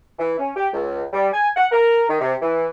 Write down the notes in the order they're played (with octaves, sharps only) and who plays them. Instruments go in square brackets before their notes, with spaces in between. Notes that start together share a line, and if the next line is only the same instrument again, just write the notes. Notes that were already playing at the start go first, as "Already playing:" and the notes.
[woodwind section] E3
C#4
G4
C#2
G3
G#5
F#5
A#4
D#3
C3
E3